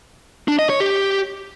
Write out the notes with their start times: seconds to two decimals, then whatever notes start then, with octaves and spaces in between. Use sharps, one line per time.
0.48 D4
0.59 D#5
0.70 C#5
0.80 G4